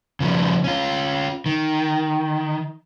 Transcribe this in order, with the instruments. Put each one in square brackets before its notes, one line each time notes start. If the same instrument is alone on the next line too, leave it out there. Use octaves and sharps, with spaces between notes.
[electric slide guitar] C#3 F3 G3
C#4 F4
D#3